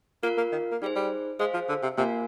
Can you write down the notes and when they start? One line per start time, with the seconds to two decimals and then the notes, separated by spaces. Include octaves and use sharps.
0.23 A#3 F4 A#4 F5
0.38 A#3
0.52 D#3
0.72 A#3
0.82 G3 D#4 G#4 C5
0.96 G3
1.40 G#3 G#4 C5 F5
1.54 F3
1.69 D3
1.83 C3
1.97 C3 A#3 F4 A#4 F5 G#5